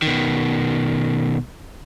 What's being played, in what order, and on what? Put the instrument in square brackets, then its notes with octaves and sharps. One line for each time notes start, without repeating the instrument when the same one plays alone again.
[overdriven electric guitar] B2 D#3